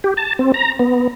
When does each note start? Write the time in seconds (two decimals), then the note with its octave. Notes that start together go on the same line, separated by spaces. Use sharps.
0.04 G4
0.17 A5
0.39 C4
0.54 A#5
0.79 B3